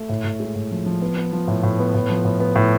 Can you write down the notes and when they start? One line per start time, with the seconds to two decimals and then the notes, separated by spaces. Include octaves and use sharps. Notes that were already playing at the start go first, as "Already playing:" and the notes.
Already playing: A3
0.09 A2
0.24 A2
0.40 G#3
0.56 A2
0.71 F3
0.86 F3
1.02 B3
1.17 B3
1.33 F3
1.48 A2
1.63 A2
1.79 B3
1.94 A2
2.10 F3
2.25 A2
2.40 B3
2.56 A2